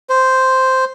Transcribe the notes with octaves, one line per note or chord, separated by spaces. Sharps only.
C5